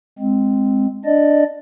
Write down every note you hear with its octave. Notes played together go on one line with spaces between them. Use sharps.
G#3 C4
D4 D5 D#5